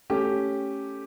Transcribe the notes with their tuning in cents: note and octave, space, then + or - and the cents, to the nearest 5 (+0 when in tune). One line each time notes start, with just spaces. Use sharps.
A3 +0 C#4 +0 G4 +0